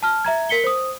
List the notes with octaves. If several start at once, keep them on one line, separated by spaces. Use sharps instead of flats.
A5 F6
E5 A#5 G#6
A#4 B6 C#7 G7
C5 D#6